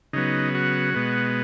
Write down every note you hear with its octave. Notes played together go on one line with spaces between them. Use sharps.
C#3 F#3 B3 D#4
F#4
B2 G#3 B3